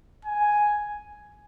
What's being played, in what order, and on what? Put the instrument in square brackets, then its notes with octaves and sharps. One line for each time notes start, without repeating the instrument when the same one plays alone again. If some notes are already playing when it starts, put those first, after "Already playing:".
[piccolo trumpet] G#5